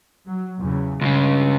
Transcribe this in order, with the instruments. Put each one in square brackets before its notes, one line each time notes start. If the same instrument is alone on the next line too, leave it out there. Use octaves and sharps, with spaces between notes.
[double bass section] F#3
E2 C#3
[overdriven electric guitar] C#2 C#3 [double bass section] G2